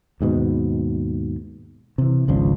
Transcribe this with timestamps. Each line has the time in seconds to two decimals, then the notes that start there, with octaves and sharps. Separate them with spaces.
0.21 D#2 G#2 B2
1.98 C3 E3
2.28 G#1 C#2 F3 D4